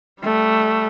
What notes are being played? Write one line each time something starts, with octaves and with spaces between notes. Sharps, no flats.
G3 A3